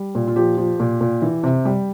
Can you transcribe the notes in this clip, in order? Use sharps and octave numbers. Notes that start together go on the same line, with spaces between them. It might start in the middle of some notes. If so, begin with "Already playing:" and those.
Already playing: G3
A#2
F4
F3 G4
F3
A#2
A#2
E3
C3
G3